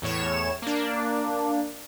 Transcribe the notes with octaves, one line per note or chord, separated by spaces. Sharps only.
E2 A2 C#5 E7
A#3 D4